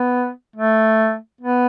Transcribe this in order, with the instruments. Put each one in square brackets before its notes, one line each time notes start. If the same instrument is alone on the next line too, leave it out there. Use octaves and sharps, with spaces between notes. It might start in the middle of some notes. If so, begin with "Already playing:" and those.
Already playing: [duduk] B3
A3
B3